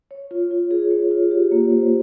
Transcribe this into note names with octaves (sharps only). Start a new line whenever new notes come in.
C#5
F4
F4
G#4
C#5
F4
G4
A#3
C5